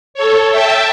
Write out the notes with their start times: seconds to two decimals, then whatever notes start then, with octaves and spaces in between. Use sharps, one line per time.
0.14 A4 C#5
0.50 E5 G5 A5